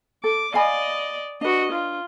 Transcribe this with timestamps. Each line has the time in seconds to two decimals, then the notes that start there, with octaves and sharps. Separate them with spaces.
0.24 A4 D6
0.54 D5 D#5 F5 G#5 B5
1.41 D4 F#4 B4 D#5
1.71 F4